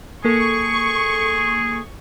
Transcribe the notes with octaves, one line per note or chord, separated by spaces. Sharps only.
A#3 G#4 A4 C#6